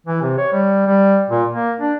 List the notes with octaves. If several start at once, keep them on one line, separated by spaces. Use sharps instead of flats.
E3
C3
C#5
G3
G3
A#2
A#3
D4